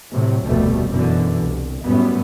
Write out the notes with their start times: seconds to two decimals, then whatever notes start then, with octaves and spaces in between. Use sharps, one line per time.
0.11 A2 C3 F#3
0.45 F1 D2 B2 G3 A3
0.90 F#2 B2 D3 E3
1.39 C2
1.84 F#2 A2 G3 B3